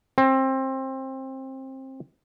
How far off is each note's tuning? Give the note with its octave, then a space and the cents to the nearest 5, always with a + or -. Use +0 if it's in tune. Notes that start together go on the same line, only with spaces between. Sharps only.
C4 +25